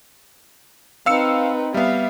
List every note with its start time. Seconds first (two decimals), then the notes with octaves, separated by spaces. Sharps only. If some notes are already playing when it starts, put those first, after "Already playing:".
1.06 C4 D#4 B4 F5 E6 C#7
1.74 G3 B3 E5 F5